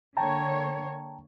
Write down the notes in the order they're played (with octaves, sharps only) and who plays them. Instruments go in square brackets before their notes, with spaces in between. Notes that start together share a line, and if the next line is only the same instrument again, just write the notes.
[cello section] D3 A#3 C#5 [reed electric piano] G5 A5 A#5